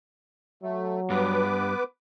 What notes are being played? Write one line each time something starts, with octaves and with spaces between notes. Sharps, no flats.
F#3 A3
G2 B3 B4 D6